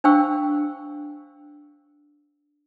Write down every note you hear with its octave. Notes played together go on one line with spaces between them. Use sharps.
D4 C5 F5 G5 C#6 E6